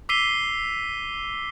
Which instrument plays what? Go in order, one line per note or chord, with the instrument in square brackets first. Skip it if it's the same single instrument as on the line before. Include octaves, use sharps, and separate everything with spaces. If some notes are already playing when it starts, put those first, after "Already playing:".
[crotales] D6 E6 B6 C7 D#7 G7